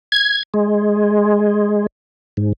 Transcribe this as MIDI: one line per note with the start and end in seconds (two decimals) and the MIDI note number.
0.12 0.43 92
0.54 1.86 56
2.37 2.53 44